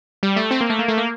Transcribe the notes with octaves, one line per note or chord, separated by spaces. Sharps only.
G3
A3
C4
A#3
A3
A#3
A3
A#3